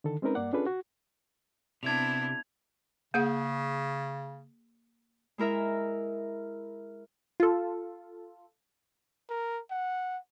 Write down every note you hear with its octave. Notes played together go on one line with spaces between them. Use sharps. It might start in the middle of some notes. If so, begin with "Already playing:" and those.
D3 D#3 A4
G#3 C4 C#4 D#4 A#4 B4
G2 A#3 D5 F#5
C#4 D4 F4 G#4 A4 B4
F#4
C3 B3 D4 E4 G#6 F7
C#3 A#3 G#4 F#5
G#3 E4 A#4 E5
F4 A4
A#4
F#5